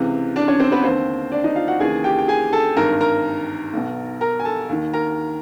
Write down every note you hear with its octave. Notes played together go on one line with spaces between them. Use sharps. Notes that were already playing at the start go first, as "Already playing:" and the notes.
Already playing: C#2 C3 E3
D4 D5
C#4 C#5
C4 C5
B3 B4
D#2 D3 C4 C5
D4 D5
D#4 D#5
F4 F5
F#4 F#5
D#2 C#3 E3 G#4 G#5
G4 G5
G5
G#4 G#5
A4 A5
G#1 G2 D#3 A#4 A#5
A#4 A#5
B1 B2
A#4 A#5
G#5
A4 A5
D#2 D#3
A#4 A#5